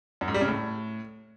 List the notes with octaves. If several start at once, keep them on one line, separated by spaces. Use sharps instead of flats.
F#2
G#2
G3
C#3
A2